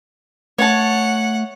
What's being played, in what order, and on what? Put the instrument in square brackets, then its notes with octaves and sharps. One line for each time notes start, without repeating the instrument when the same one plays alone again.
[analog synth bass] A3 [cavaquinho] C#5 A5 [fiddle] F#5